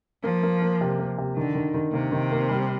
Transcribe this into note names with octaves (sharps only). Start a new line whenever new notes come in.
F3 A#3
A#3
A#3
C3
A#3
C3
D3 D#3
D#3
D#3
C3 A#3
D#3
A#3
G3